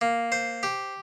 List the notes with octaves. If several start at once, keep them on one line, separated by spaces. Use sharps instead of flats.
A#3
C5
G4